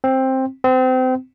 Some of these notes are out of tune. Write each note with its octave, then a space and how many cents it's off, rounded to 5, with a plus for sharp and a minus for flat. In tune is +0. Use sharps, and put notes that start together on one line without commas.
C4 +10
C4 -30